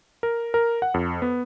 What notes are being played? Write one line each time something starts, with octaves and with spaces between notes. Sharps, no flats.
A#4
A#4
F#5
F2
B3